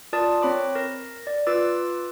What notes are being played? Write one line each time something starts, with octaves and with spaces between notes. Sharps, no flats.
F4 A#4 D5 A5 D#6 A6
C4 C#5 B5 D6
A#4 A#6
D5
F4 B4 D6 E6 A6